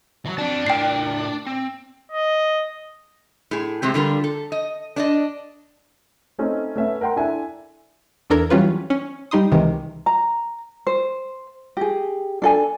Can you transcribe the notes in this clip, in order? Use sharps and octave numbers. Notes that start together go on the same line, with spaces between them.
E3 F#3
C4 D4 A5
A2 A#4 G5 C7
C4
D#5
A2 G#4
C3 G#3 C4 G4
D3 G3 F4 A#4
A4
D#5
D4 D5 D#5
A3 C4 C#4 D#4 A4
A3 B3 C#4 E5
A#4 F#5 G5 A#5 C6
D4 E4 A4 E5 G#5
E2 D4 A4 A#4 G#6
E3 F#3 G3 C#4 F4 B4
C#4
G3 D#4 C6 D#6
C#2 C3 D#3 E3 G#3
A#5
C5
G4 G#4
D4 A4 G#5